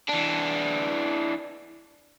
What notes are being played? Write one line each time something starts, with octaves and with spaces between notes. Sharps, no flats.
E3 D4